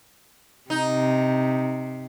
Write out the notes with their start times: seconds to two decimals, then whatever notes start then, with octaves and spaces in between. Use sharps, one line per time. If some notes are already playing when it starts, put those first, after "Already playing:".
0.70 C3 D#4